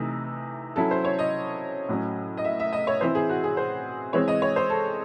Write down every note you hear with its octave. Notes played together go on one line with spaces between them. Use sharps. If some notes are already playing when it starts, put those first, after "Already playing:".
Already playing: C3 E3 A3 D#4
F#3 C#4 E4 A4
C5
C#5
D#5
A2 F#3 C#4
D#5
E5
E5
D#5
C#5
E3 C4 E4 C5
G#4
F#4
G#4
C5
E3 G#3 C4 C#5
D#5
C#5
C5
A4